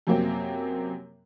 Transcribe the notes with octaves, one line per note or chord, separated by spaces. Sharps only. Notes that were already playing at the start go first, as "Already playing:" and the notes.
F#2 C3 F#3 A#3 C4